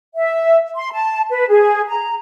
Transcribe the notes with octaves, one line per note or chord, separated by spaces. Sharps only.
E5
C6
A5
B4
G#4
A#5